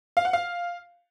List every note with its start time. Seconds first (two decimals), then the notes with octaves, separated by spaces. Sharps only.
0.17 F5
0.25 F#5
0.33 F5